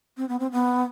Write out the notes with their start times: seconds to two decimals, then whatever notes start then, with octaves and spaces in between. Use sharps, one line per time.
0.17 C4
0.29 B3
0.40 C4
0.52 B3